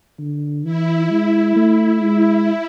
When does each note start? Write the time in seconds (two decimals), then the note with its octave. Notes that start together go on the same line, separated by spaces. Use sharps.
0.19 D3
0.64 E3 E4
1.10 G#3 E4
1.56 A3
2.02 G#3